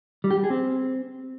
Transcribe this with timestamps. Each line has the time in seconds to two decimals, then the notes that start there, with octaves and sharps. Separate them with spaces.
0.24 G3
0.31 G4
0.37 G3
0.44 G#4
0.50 C4